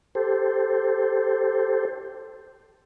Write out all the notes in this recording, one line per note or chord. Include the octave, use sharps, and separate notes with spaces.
G4 A4 C5